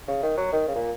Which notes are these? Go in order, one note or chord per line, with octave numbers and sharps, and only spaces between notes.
C#3
D#3
F#3
D#3
C#3
A#2